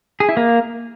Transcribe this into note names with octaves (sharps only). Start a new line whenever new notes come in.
G#4
E4
A#3